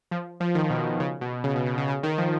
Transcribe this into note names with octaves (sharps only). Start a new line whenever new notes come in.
F3
F3
D#3
B2
C#3
B2
C#3
B2
B2
C#3
C#3
D#3
F3